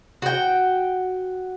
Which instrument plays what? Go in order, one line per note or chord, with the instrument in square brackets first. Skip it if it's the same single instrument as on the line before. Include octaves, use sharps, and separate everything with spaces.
[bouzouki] F#4 G5